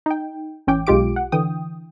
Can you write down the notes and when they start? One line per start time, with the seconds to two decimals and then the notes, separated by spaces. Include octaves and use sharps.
0.06 D#4 G5
0.67 A1 C#4 G5 D6
0.87 B1 G#3 F4 G4 D6 D7
1.16 F#5
1.32 D3 E3 G5 D#6